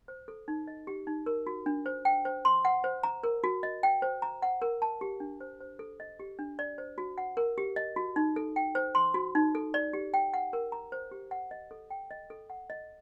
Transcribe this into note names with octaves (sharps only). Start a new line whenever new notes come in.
C5
A4
D#4
D#5
G4
D#4
A#4
F#4
D4
C5
G5
C5
C6
F#5
C5
A#5
A#4
F#4
D#5
G5
C5
A#5
F#5
A#4
A5
G4
D4
C5
C5
A4
D#5
G4
D4
D5
C5
F#4
F#5
A#4
G4
D#5
F#4
D#4
A4
G5
C5
C6
F#4
D#4
A4
D5
G4
G5
F#5
A#4
A#5
C5
G4
F#5
D#5
A4
G5
D#5
A4
F#5
D#5